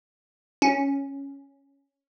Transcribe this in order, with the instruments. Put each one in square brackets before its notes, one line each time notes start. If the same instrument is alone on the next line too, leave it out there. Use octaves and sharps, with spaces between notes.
[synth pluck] C#4